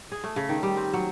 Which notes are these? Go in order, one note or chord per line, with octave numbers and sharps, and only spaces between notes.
G#4
A3
C#3
D#3
G3
C4
F#3